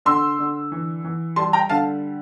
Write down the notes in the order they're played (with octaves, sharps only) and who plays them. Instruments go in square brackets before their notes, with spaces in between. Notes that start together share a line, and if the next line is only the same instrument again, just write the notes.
[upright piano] D3 C6 E6
D3
E3
E3
G3 A5 C6
G5 A#5
D3 F5 A5